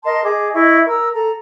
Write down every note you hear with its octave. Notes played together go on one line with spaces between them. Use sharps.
A#4 D#5 A5 C6
G#4 D#5 D6
E4 D#5 E5 C#6
A#4 E6
A4 A#5